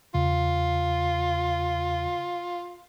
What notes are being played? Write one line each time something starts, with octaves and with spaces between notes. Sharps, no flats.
E2 C#3 F4